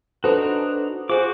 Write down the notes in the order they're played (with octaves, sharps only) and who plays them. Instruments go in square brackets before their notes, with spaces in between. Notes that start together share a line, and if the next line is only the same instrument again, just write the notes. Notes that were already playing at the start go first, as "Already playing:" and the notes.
[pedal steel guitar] D4 D#4 F#4 [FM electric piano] A4 B4 C5
[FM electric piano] F4 G#4 [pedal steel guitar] F#4 D6 [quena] C5